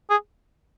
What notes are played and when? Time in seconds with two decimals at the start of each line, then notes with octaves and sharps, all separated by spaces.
0.10 G#4